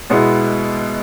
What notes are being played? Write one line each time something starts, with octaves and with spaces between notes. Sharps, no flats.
B2 G#3 B3 E4